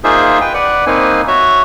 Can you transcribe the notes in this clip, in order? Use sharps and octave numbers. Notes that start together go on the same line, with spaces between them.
A#3 D#4 F4 G#4 C5 E5
B4 G5
B4 D5 F#5
A#3 C4 D#4 B4 G#5
F#4 C#5 E5